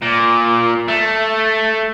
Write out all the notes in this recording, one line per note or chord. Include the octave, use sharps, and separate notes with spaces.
A#2
A3